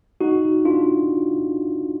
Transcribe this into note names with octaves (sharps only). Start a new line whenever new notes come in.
D#4 F#4
D4 F4